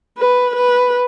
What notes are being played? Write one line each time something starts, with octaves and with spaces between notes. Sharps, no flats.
B4
B4